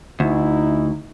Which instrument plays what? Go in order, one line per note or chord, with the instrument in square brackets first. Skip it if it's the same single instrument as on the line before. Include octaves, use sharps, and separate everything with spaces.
[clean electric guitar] D2 [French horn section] D#4 E4